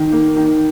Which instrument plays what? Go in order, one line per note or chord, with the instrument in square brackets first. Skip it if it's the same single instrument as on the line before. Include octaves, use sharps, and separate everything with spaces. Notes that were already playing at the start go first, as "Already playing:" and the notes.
Already playing: [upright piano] D#3
A#3
D#3